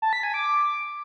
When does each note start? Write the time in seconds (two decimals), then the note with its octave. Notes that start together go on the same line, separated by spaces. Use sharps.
0.02 A5
0.13 B6
0.23 G#5
0.34 D6